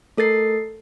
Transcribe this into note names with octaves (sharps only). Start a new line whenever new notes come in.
A3 A4 A#4 A6 C7